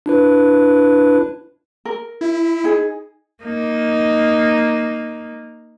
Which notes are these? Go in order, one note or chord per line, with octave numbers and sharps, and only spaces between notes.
D4 E4 B4
A#4
E4
D#4 G#4
A#3 D#4